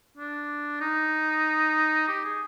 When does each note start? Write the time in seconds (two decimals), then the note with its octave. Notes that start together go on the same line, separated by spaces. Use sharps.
0.18 D4
0.81 D#4
2.08 G4
2.24 G#4